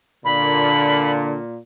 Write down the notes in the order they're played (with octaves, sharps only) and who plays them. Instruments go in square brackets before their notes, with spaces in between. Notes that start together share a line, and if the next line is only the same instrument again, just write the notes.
[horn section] A#2 [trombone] D3 [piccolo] B5